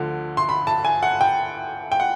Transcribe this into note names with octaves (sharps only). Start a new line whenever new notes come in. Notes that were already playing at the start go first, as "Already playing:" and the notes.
Already playing: D2 D3 F3
C6
B5
A5
G#5
F#5
G5
G5
F#5